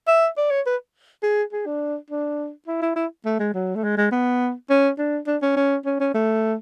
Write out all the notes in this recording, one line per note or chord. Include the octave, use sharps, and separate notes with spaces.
E5
D5
C#5
B4
G#4
G#4
D4
D4
E4
E4
E4
A3
G#3
F#3
A3
G#3
G#3
B3
C#4
D4
D4
C#4
C#4
C#4
C#4
A3